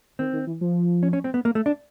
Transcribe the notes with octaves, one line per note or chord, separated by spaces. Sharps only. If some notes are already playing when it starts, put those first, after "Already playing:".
D#3 C4
D#3
E3
F3
C#4
C#4
C4
B3
A#3
A3
D4